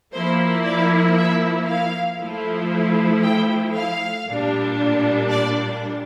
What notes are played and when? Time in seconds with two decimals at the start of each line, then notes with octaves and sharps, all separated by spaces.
0.13 F3 A#3 E4 C5
0.65 D5
1.17 E5
1.68 F5
2.19 F3 A3 E4
3.24 G5
3.75 F5
4.27 A#2 G3 D4
5.30 D5